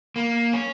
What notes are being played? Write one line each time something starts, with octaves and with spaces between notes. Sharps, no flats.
A#3
C#4